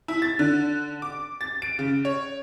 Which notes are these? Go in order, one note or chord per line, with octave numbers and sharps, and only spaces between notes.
E4
A6
D3
D6
A6
D7
C#3
C#5